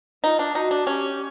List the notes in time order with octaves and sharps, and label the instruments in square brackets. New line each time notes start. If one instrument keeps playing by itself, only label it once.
[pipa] D#4 [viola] F4
[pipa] D4
[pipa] D#4 [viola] F#4
[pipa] D4
[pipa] C#4 [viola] G4